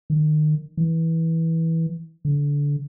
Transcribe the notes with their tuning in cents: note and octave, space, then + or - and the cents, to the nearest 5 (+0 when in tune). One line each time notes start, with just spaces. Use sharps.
D#3 -30
E3 -15
D3 -25